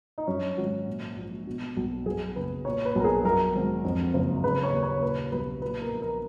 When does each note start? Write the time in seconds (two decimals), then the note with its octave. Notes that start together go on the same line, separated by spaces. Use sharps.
0.18 D#4
0.27 F#2 C#4
0.58 G#1 F#4
0.87 A#2
1.16 A#1
1.47 B2
1.77 B1
2.06 F#2 G#4
2.36 F#1 B4
2.65 A#2 C#5
2.85 B4
2.95 B1 A#4
3.04 G#4
3.24 F#2 A#4
3.55 G#1
3.84 F2
4.14 F#1
4.44 C#3 B4
4.63 C#5
4.72 D#2
4.83 C#5
5.03 A#2 B4
5.32 B1 B4
5.62 A#2 B4
5.82 A#4
5.91 A#1
6.02 A#4